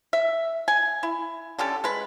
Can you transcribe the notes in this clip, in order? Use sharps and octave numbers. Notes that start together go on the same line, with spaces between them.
E5
G#5
E4
D3 C#4 G4 A4
G#3 B4